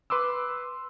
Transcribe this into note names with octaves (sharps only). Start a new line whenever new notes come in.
B4 C6 D6 E6